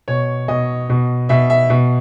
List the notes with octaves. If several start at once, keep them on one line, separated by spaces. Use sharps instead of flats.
B2 C#5
B2 D#5
B2
B2 E5
E5
B2